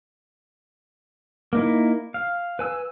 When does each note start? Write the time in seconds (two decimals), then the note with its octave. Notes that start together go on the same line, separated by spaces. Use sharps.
1.53 A#3 D#4 E4
2.14 F5
2.59 B4 G#5 E6